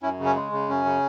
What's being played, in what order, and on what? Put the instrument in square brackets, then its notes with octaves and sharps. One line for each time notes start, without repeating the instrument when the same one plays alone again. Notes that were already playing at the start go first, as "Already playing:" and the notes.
[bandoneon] F#2 C#4 E4
C#3
C#4
G#3
C#3
F#2 C#4
C#3